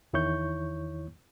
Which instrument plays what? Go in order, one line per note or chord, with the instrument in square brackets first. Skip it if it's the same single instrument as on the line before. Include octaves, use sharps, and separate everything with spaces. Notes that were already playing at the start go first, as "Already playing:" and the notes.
[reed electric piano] E2 D#3 E4 C#5 C#6 G6